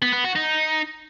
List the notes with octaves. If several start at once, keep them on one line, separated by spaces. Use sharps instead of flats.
B3
B3
F#4
D#4